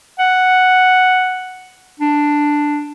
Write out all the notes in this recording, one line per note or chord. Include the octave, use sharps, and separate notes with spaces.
F#5
D4